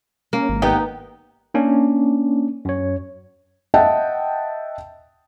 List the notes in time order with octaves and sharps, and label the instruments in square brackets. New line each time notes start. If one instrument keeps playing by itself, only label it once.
[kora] A#3 [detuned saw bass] C#4
[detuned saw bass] G#1
[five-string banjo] B3 G4 G5 [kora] D#4
[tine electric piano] A#3 C#4 D4
F#2 C#5
[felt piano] D#5 E5 F#5 G5 A5